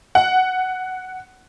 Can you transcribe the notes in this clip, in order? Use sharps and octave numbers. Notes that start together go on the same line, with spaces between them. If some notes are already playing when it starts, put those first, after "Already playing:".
F#5